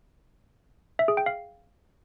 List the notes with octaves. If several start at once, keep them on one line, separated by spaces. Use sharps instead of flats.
E5
G#4
G5
F5